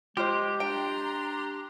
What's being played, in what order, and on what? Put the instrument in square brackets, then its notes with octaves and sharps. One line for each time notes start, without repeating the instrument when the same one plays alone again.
[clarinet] G#3 [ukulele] F4 C5 [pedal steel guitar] G4
[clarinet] D4 [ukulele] G5 [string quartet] A#5 C6